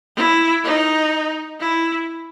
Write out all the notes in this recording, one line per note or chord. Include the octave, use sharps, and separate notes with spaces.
E4
D#4
E4